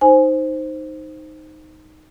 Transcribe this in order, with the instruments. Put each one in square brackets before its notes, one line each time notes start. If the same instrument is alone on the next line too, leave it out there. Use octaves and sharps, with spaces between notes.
[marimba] D#4 C5 G#5